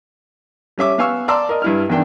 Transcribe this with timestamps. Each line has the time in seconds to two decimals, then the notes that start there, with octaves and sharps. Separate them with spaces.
0.78 G3 C#4 E5 D6
0.98 B3 F5 G#5 C#6 E6
1.28 D5 A5 A#5 C6 D6 E6
1.49 A#4 D5 D#5
1.62 G2 E4 F6
1.89 E2 D#3 D4 G5